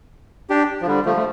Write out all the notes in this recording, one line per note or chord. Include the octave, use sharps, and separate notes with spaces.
D4 G4
F3
D3 G3
F3 A3
A3